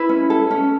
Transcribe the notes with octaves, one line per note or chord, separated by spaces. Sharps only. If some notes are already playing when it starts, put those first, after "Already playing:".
Already playing: E4 B4
C#4
A4
C#4